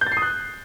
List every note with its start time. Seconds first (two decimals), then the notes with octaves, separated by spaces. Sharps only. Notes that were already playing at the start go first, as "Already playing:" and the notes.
0.01 G6
0.07 A6
0.12 C7
0.17 D#6
0.22 F#6